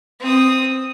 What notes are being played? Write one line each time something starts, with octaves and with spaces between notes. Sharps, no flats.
C4 D#6